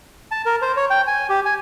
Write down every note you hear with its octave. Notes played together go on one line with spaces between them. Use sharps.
A5
A#4
C5
C#5
G5
G#5
G4
G#5